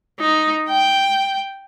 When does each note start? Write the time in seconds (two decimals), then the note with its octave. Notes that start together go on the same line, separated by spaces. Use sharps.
0.20 D#4
0.69 G5